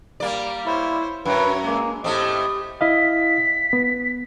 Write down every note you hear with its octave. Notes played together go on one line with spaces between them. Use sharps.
G3 A#3 D5
E4 C5 C#5
F#2 B4 C#5 A#5
G#3 A#3
A2 A3 C4 G4 D#5
E4 D#5 F5 B6
B3